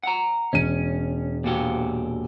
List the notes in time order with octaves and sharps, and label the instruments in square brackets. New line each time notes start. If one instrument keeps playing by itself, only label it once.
[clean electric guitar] F#5 A#5
[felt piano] E1 D#7 [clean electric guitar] C#4
[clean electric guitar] A#2 F#4 G4